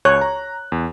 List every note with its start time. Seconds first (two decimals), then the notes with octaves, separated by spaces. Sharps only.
0.05 C#2 C#5 F#6
0.21 A#5
0.72 E2